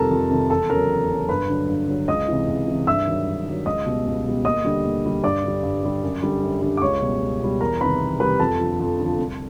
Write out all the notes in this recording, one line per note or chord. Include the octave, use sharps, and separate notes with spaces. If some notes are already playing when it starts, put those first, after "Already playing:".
Already playing: F2 C3 D#3 G3 A4 A#4 A5 A#5
F2
C3 D#3 G3
E2 A4 A5
C#3 F#3 A#4 A#5
E2
C#3 F#3
G2 B4 B5
D3 F#3
G2
D3 F#3
C#2 D#5 D#6
C3 E3
C#2
C3 E3
G2 E5 E6
D#3 F#3
G2
D#3 F#3
C#2 D#5 D#6
B2 G3
C#2
B2 G3
D#2 D#5 D#6
D3 G3
D#2
D3 G3
G2 D5 D6
D3 G3
G2
D3 G3
F#2
D3 G3
F#2
D3 G3
D6
C#2 C#5 C#6
B2 G3
C#2
B2 G3
E2 A#4 A#5
C3 D#3 G3 B4 B5
E2
C3 D#3 G3 B4 B5
F2 A4 A5
D3 F3
F2
D3 F3
C2